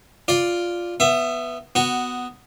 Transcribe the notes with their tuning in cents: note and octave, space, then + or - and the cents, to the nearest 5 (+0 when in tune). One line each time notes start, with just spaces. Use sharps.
F4 +0 D5 +0
B3 +0 E5 +20
B3 +10 F#4 +0